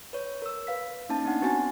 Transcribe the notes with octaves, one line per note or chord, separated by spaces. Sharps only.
B4 C#5
A#4 E6
B4 F5 B6
A#3 C#4 D#4 A5
B3 D4 F#5
B3 C4 F#4 G#5 A6